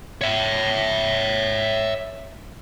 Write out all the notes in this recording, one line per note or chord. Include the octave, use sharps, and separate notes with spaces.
C#5 E5